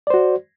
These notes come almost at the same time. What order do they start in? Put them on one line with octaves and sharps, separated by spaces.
D5 C5 F#4